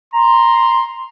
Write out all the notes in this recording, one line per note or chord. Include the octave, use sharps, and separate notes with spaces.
A#5 C6